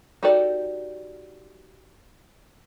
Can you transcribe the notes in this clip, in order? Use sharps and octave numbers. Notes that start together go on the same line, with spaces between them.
D#4 F#4 G4 A4 D5